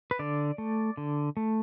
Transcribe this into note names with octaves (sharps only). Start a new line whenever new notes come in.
B4
D3 D5
A3
D3
A3